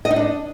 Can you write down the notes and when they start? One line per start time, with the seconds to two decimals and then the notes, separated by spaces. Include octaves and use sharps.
0.05 D#5
0.11 D#4
0.16 D4